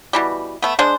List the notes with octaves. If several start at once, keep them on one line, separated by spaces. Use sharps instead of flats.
B2 E3 G3
A3 B3
G#3 D4 G#4 C5